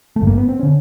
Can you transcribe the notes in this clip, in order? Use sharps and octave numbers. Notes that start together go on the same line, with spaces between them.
A3
G#1 G2 D3
A#3
B3
C4
D3 C#4